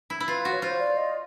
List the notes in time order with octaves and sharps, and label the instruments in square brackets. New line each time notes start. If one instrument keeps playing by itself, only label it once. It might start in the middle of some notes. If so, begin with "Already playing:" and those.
[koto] E4
E4
[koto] F4 [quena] B4
[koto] F#4
[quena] C#5
[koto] F4 [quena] C5
[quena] D5
D#5